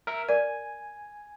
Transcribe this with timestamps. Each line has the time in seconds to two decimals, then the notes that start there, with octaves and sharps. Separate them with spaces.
0.07 A#4 E5
0.29 A#4 D5 G#5